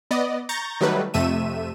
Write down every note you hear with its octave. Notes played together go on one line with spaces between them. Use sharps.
B3 D5 D#5
A#5 C#6 G6 A6 A#6
D#3 F#3 G3 A3 B4
F2 C3 A3 E5 D#7 E7